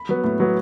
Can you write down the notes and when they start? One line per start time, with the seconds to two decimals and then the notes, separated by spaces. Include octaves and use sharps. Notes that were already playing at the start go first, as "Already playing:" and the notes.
Already playing: B5
0.09 F#3 B3
0.24 A2
0.40 F#3 B3